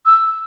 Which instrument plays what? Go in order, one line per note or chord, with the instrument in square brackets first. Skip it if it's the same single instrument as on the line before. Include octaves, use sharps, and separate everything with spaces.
[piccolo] E6